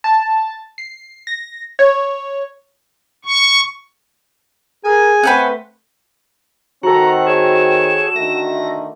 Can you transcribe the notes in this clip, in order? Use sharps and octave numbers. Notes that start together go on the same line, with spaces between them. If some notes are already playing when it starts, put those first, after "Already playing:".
A5
C7
A#6
C#5
C#6
G#4 A#4 G#5
A3 C4 B4 C5 F#5
D#3 C4 F#4 A4 F#5 A#5
G#4 C#5 E7
D3 D#3 A3 A#6